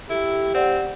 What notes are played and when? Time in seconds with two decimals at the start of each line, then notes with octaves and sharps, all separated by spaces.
0.10 E4 G4 A4
0.55 C4 D5 F#5